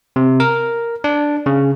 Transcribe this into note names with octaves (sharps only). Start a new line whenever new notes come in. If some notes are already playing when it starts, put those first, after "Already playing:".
C3
A#4
D4
C#3